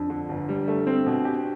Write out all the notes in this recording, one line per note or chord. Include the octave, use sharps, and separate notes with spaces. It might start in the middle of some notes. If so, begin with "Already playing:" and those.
Already playing: F2 D4
D3
G1
G3
A3
C4
B2
G4